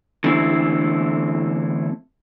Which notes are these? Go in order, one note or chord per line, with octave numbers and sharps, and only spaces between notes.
D3 E3 A3 C4 E4